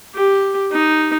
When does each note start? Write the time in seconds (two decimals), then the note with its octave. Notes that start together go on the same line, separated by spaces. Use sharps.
0.15 G4
0.72 D#4